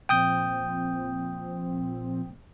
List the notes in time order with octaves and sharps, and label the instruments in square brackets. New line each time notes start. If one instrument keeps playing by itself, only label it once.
[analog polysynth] A#2 F3 C4 [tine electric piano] G5 D#6 G6